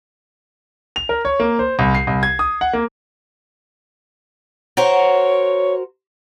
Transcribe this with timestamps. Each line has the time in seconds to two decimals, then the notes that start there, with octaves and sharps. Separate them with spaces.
0.96 F7
1.09 A#4
1.25 C#5
1.40 A#3
1.59 C5
1.79 C2
1.95 C7
2.07 C2
2.23 G#6
2.39 D#6
2.61 F#5
2.73 A#3
4.77 F#4 A#4 C5 C#5